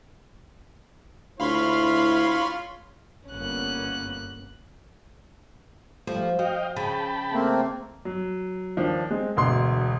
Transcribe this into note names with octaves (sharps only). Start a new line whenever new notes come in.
D2 E4 F4 C#5 F5 B5 C6
G1 A#3 B3 C#4 F#6
F3 G3 A3
F#4 D#5 F5 G5
C#3 G5 A5 B5
A3 A#3 C4
F#3
D#2 F3 D4
G#3 C4
E1 D2 B2 C6